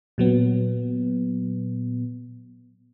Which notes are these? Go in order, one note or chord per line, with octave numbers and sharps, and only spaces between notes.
A#2 F#3 B3